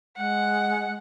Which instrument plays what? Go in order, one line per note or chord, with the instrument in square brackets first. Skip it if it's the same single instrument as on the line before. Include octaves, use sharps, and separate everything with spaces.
[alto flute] G#3 [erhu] F#5